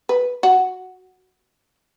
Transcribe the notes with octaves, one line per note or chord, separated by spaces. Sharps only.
B4
F#4